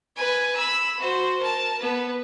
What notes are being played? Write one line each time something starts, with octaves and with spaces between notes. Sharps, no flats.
B4 G#5
B5 E6
F#4 C5
A#4 A5
B3 B4